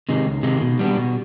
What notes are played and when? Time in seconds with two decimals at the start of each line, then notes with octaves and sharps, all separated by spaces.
0.09 C3 D#3 G#3
0.26 C#2
0.43 C3 D#3 G#3
0.62 B2
0.79 G3 B3 D4
0.97 B2